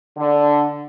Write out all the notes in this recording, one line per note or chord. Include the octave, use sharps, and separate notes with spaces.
D3